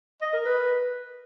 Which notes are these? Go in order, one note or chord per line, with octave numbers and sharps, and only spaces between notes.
D#5
A#4
B4